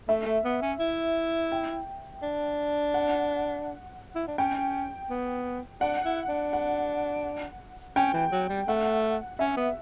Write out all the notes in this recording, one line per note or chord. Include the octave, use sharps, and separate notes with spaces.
A3 E5
A3
B3
C#4
E4
G5
D4
F#5
E4
D4
C#4 G5
B3
D4 F#5
E4
D4
F#5
C#4 G5
E3
F#3
G3
A3 F#5
C#4 E5
B3